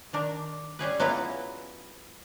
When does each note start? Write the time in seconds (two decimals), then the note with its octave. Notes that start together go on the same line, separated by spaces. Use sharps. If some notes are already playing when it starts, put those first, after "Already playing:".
0.13 D#3 D4 A#4
0.79 G3 C#4 G#4 B4
1.00 F#3 B3 C#4 E4 F4